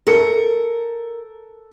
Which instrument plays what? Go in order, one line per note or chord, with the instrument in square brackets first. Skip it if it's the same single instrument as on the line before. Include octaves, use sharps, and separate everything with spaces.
[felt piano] A4 C#7 [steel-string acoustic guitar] A#4